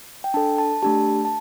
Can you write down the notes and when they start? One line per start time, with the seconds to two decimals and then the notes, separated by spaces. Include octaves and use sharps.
0.24 G5
0.34 D4 A4 A5
0.58 A5
0.83 A3 D4 G4 A5
1.25 A5